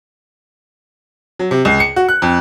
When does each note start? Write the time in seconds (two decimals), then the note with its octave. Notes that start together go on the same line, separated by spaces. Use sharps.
1.39 F#3
1.51 C3
1.65 C#2
1.80 C#7
1.96 F#4
2.09 F#6
2.22 F2